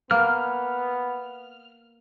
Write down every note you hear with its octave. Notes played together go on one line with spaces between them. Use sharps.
A#3 B3 F6